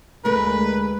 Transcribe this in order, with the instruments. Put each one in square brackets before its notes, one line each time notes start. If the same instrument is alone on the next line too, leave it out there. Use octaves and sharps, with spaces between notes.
[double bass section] D2 G#3 [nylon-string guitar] A3 A#4 [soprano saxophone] B4